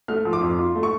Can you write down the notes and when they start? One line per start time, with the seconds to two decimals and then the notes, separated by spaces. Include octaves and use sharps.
0.08 A3 F6
0.25 F3
0.33 D6
0.41 F2
0.59 F4
0.75 A3
0.83 C#6